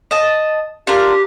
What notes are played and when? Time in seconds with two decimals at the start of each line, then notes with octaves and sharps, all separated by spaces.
0.11 D#5 A5
0.87 D4 F4 G4 A#4